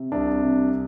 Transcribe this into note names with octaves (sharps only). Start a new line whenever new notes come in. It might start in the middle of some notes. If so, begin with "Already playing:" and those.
Already playing: C3
C2 D4
C3